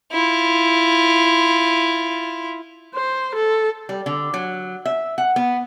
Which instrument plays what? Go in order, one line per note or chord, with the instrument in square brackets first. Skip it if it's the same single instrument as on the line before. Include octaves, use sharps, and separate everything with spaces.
[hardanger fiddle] E4 F4
[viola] C5
A4
[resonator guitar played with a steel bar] G3
D3
F#3
E5
F#5
B3